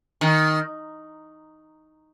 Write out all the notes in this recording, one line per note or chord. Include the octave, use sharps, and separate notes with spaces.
D#3